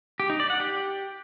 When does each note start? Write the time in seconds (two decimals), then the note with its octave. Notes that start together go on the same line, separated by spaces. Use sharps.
0.20 G4
0.30 D#4
0.40 D5
0.50 F#5
0.60 G4